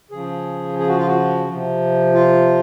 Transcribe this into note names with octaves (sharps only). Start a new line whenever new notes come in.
C#3 F3 G#4
G#4
F#4
F4
F#4
C3 F3
F4